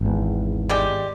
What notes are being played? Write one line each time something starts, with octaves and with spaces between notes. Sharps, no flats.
G#1 E2
G3 G#3 G4